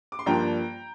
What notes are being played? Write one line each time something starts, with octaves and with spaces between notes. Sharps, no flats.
D6
C6
G2 F3 A#3 D4 G5 A#5